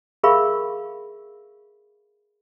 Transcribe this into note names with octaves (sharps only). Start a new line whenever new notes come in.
G#4 A#4 E5 F5 B5 C#6